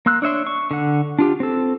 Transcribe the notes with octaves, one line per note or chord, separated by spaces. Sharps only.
A#3 C6 E6 F#6
D4 C#5 E5 C6
C#6
D3 F#5
D4 F4 G4
C4 A4